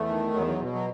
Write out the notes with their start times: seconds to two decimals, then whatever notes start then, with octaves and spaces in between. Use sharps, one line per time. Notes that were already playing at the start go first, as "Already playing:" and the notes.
Already playing: E2 A3
0.09 D#3
0.34 E2 F#3
0.47 F#3
0.60 B2
0.73 F#3